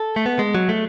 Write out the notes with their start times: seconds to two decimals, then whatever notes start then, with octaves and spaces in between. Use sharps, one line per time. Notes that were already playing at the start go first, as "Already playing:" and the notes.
Already playing: A4
0.16 A3
0.26 B3
0.39 G#3
0.55 F#3
0.69 A3